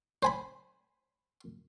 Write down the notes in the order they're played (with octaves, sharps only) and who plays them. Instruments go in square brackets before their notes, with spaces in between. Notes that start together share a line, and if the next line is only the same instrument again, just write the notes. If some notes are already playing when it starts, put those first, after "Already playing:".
[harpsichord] C5 G#5 B5